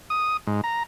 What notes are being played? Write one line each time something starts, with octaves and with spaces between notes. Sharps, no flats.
D#6
G#2
A#5